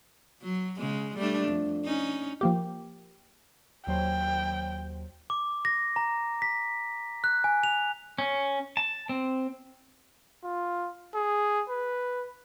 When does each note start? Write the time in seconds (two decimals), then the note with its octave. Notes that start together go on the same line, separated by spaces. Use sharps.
0.42 F#3
0.79 C#3 G#3
1.17 G3 A3 D4
1.48 F2
1.84 C#4 D#4
2.41 F3 A#3 G4
3.87 D#2 F#3 C5 G5
5.30 D6
5.65 A#6
5.96 A#5
6.42 B6
7.24 F#6
7.44 G#5
7.63 F7
8.18 C#4
8.77 A5
9.09 C4
10.44 F4
11.15 G#4
11.69 B4